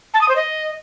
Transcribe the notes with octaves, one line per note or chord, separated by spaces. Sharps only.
A5
D#6
C5
D#5